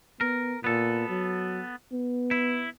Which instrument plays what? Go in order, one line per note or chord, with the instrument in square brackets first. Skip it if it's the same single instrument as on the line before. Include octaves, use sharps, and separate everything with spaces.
[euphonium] B3 [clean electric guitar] A#4
[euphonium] A#2 [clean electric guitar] B3 A4
[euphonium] F#3
B3
[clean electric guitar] E4